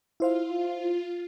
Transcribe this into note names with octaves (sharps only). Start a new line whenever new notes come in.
E4 F4 C5 F5